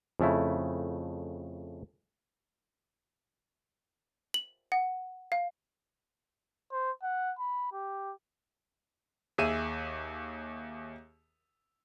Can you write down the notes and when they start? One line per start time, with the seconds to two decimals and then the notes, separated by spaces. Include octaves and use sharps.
0.20 F2 C#3 A3 E4
4.34 F#7
4.72 F#5
5.32 F5
6.72 C5
7.03 F#5
7.39 B5
7.73 G4
9.38 D#2 G#4 E5 D#7